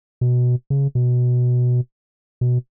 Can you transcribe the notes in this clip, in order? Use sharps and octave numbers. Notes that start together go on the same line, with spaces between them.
B2
C#3
B2
B2